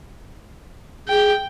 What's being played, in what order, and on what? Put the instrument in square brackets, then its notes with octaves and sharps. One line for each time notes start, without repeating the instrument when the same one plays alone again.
[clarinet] G#4 [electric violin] G5